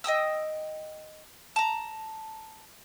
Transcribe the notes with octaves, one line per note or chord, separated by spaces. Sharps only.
D#5 G5 D#6 E6
A5 A#5